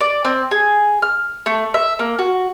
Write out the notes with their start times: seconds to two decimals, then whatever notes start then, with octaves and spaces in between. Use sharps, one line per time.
0.01 D5
0.25 C4
0.51 G#4
1.02 F6
1.46 A3
1.74 E5
1.99 A#3
2.19 F#4